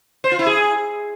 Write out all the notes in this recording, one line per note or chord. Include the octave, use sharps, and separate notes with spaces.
C5
F4
E4
G#4